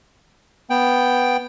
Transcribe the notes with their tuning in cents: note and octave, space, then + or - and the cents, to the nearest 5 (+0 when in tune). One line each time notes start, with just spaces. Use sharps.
B3 +0 G5 +0